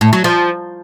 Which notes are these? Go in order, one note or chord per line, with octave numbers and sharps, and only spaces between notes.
A2
F#3
F3